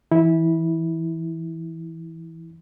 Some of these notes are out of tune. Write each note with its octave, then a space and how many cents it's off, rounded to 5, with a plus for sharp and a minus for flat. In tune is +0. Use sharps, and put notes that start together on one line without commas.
E3 +0 E4 -20